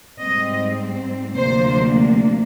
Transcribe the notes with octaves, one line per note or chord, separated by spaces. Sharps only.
G#2 G3 C4 D#5
D2 C3 F3 A#3 D4 C5